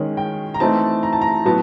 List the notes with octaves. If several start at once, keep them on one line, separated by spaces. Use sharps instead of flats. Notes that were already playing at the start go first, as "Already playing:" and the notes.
Already playing: D#3 G#3 C#4 C#5
G5
A#5
E3 A3 C4 D#4 A5
A#5
A5
A#5
A2 F#3 B3 A5